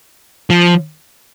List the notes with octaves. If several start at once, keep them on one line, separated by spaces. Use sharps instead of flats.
F3